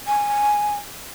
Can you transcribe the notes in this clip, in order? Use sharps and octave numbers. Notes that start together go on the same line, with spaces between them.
G#5